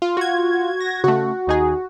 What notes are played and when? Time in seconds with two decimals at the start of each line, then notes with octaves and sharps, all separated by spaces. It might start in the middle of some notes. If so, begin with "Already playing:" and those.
0.02 F4
0.17 F#4 G#6
0.80 A#6
1.04 C#3 A3 F#4
1.47 D#2 D#4 G#4